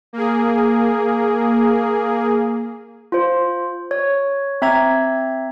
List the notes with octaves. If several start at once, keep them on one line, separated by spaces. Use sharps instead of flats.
A#3 G#4
F4 C5
C#5
C4 E5 A#5 G#6